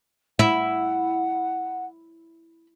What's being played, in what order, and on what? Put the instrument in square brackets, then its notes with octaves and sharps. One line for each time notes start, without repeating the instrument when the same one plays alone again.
[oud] E4 [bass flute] F#5